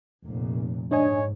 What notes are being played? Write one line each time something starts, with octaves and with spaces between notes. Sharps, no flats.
F1 A#2
G#2 D4 C#5 D#5 G#5